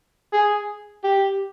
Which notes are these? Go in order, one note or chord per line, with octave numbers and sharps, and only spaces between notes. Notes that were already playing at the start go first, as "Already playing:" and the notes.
G#4
G4